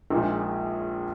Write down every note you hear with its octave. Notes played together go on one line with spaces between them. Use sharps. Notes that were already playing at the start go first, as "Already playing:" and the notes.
A#1 A#2 G#3 D#4